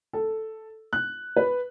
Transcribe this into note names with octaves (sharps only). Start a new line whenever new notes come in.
A4
F#6
B4